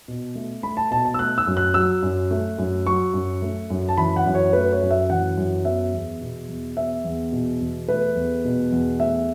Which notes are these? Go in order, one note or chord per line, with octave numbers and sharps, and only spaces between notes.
B2
A3
A3 B5
A5
B2 A5
A5
E6
A3 F#6
E6
F#2
F#6
F#3 E6
F#2
A3
F#2
F#3 C#6
F#2
A3
F#2
A5
E3 B5
F#5
F#2
C#5
A3 B4
C#5
F#2
E5
E3 F#5
F#2
B3 E5
E2
B2
E2
B3 E5
E2
B2
E2
A3 B4
E2
B2
E2
A3 E5